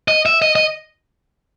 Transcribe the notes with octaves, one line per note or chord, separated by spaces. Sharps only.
D#5
E5
D#5
D#5